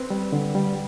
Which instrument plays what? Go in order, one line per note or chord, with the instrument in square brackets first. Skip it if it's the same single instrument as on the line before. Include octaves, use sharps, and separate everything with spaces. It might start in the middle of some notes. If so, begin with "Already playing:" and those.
Already playing: [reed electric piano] C4 B4
G3
D3
G3